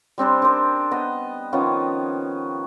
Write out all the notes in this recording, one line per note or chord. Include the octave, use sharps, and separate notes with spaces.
G3 C4 D4 C5
D4 A#4 C5
B3 D#5
D#3 F3 B3 C#4